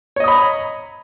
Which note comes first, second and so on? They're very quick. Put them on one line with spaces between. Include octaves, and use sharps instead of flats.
C#5 D#5 D#6 B5 A#5